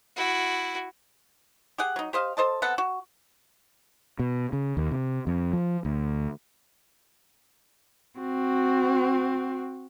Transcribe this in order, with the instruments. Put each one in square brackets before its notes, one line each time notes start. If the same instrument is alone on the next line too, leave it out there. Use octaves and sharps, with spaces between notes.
[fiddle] E4 F#4
[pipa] G4 G#4 F#5
F#3 D#4
G4 C5 D#5 F5
A4 C5 D#5 A5
B3 C4 A4 F#5
F#4
[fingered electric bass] B2
C#3
D#2
C3
F2
F3
D2
[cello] C4 F#4